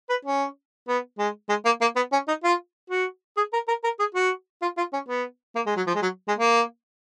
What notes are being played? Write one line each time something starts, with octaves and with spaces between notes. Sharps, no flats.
B4
C#4
B3
G#3
G#3
A#3
A#3
B3
C#4
D#4
F4
F#4
G#4
A#4
A#4
A#4
G#4
F#4
F4
F4
C#4
B3
A#3
G#3
F#3
F3
G#3
F#3
G#3
A#3